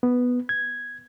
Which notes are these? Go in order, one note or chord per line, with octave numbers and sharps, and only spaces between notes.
B3
G#6